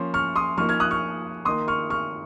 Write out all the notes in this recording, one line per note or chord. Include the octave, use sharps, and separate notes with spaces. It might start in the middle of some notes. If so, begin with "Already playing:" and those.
Already playing: F3 A#3 C#4 C6
C#6 F6
C6 D#6
F3 A#3 D#4 C#6 F6
F6 G#6
D#6 F#6
C#6 F6
D#3 A#3 D#4 C6 D#6
C#6 F6
C#6 F6